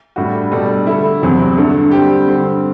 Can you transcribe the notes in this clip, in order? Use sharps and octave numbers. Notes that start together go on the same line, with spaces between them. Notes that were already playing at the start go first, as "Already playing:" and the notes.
A2 G3 D4 F#4
B2 G3 D4 A4
D3 A3 E4
E2 C3 F#3 C4 E4
G2 D3 A3 D4
D3 G3 C4 G4
G2 D3 G3 C4